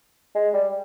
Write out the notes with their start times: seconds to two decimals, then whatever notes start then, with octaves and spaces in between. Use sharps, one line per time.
0.35 G#3
0.54 G3